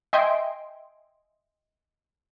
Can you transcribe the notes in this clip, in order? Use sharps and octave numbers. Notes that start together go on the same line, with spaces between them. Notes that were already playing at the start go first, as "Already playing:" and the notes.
D#5 E5 G5 G#5 C6 D7